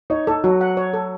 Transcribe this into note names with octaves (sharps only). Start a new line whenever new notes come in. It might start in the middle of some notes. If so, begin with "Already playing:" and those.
D#4 C#5
D#4 A4
F#3 F#4
F#5
C#5
A4